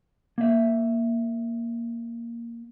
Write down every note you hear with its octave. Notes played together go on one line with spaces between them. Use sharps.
A#3 E5